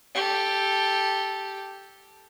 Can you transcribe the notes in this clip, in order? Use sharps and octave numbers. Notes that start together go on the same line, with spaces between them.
G4 A4